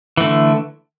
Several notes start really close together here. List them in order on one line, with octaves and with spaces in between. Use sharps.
E3 A3 D3